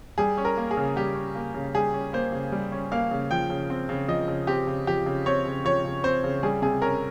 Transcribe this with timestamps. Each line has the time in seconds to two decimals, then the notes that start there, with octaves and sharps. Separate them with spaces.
0.18 G3 G#4
0.37 C#4
0.45 A#4
0.57 A#3
0.71 G#4
0.77 C#3
0.96 G3 G4
1.15 C#4
1.35 A#3
1.54 C#3
1.75 G3 G#4
1.93 C#4
2.13 A#3 C5
2.32 C#3
2.52 G3
2.72 C#4
2.92 A#3 F5
3.11 C#3
3.31 F3 G5
3.50 C#3
3.70 C4
3.89 C#3
4.08 F3 D#5
4.28 C#3
4.47 C4 G4
4.67 C#3
4.87 F3 G4
5.06 C#3
5.26 C4 C#5
5.46 C#3
5.64 F3 C#5
5.84 C#3
6.04 C4 C5
6.24 C#3
6.43 G3 G#4
6.62 C3 G#4
6.82 C#4 A#4